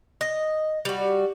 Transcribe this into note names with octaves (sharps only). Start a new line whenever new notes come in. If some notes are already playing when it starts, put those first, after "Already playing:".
D#5
G3 F#4